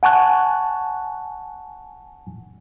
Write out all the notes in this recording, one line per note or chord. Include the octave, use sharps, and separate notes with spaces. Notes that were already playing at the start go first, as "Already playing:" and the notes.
F#5 G#5 A5 C#6 F#6